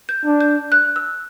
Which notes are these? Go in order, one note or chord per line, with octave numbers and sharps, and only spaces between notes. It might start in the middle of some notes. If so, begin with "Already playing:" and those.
G6
D4
G6
F#6
E6